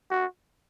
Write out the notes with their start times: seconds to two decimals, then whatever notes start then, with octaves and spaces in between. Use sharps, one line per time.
0.11 F#4